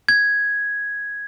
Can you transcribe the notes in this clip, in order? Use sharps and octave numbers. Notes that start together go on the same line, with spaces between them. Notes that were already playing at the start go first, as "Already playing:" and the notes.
G#6